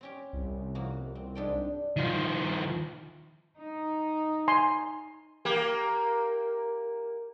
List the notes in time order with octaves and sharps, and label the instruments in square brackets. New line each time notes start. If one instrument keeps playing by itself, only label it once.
[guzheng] C4 C#4 G4
[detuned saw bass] C2
[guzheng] F2 A#3 F#4
C4
G#2 D4 G5
[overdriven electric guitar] D#3 F3
[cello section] D#4
[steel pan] G#5 C6
[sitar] A#3 G4